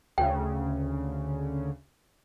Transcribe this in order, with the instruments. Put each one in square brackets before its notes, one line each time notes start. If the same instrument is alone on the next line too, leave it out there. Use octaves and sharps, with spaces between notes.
[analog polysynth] D2 C#3 [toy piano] G5